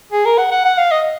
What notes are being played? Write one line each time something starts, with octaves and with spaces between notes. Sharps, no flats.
G#4
A#4
F#5
F#5
F#5
F5
D#5